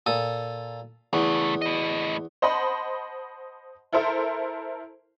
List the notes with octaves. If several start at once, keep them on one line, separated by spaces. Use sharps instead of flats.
A#2 A4 D#6
E2 C#3 A3
A2 D#5
C5 D#5 F#5 A5 B5 C6
E4 A4 A#4 C5 E5